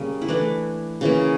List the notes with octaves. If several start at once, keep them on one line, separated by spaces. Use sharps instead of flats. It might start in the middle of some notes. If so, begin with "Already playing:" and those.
Already playing: C#3 G3 A#3 C#4
E4
E3 A3 D4
C#3 E3 A#3